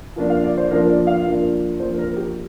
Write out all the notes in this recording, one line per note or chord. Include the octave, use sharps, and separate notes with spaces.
F3 A#3 D4
F5
D5
C5
F3 A#3 D4 A#4
D5
F5
F3 A#3 D4
F3 A#3 D4 C5
A#4
G4